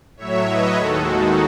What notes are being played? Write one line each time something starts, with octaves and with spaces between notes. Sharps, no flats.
A2 F#3 C#5 E5
B4 D#5
D#2 D#3 G#3 F#4 A4
D#4 F#4